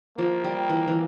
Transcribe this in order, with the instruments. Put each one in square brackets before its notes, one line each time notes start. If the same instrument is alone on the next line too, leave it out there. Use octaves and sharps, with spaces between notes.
[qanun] F3 [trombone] A#3
[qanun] G3
E3
E3